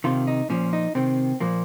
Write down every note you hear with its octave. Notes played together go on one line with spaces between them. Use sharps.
C3 D#3 F4
D#4
A#2 F3 C#4
D#4
C3 D#3 C4
A#2 F3 A#3